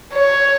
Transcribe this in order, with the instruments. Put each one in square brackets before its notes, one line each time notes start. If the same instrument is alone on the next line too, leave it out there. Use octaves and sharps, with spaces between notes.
[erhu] C#5